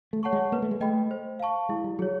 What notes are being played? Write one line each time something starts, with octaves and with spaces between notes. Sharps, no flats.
A3
C#5 F#5 A5 C#6
G#3
A#3 B4
A3
G#3
A3 D#5 G5 B5
C5
F5 A5 C#6
G#3 E4
G3
F#3 G#4 C#5